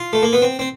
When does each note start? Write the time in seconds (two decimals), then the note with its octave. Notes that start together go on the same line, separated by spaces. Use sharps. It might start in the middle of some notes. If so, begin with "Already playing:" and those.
Already playing: F4
0.13 A3
0.23 A#3
0.33 B3
0.42 C4
0.59 C4